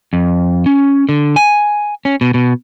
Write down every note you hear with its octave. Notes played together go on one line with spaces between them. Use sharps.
F2
C#4
D3
G#5
C#4
B2
B2